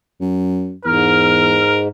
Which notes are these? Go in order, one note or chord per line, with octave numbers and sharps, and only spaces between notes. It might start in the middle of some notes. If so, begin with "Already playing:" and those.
F#2
E2 G#2 A#4 F6